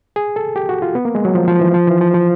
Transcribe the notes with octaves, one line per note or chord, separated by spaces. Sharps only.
G#4
A4
G4
F#4
F4
B3
A#3
G#3
F#3
F3
F3
E3
F3
E3
F3
F3